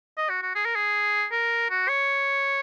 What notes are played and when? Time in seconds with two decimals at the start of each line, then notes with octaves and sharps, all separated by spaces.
0.17 D#5
0.29 F#4
0.43 F#4
0.55 G#4
0.65 A#4
0.76 G#4
1.32 A#4
1.70 F#4
1.89 C#5